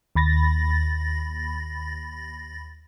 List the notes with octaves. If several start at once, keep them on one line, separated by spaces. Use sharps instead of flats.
D#2 B5 A6 A#6